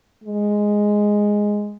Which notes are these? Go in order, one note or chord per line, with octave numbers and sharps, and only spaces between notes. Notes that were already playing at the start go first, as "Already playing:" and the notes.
G#3